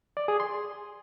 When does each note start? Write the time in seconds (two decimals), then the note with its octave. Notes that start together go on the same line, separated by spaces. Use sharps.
0.17 D5
0.28 G#4
0.40 C6